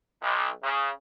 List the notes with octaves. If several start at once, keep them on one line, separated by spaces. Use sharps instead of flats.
B1
C#3